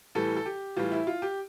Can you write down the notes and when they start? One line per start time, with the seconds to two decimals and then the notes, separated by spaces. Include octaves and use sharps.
0.15 A2 E3 G3 A4
0.37 A4
0.46 G4
0.76 A2 E3 G3 F4
0.92 E4
1.07 F4
1.22 G4